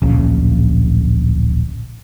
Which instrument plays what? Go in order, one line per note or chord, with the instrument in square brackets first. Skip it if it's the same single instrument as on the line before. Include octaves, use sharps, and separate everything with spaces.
[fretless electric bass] D1 A#1 C#3